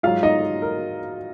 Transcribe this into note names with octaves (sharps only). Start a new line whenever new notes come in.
G#2 F#3 F4 F5
D#4 D#5
A#4